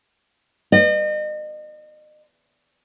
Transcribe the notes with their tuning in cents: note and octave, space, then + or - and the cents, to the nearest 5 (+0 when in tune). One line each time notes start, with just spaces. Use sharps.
D#5 -40